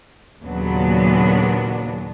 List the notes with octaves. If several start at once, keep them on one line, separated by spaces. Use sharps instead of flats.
D#2 A#2 C#3 F#3 B3 D4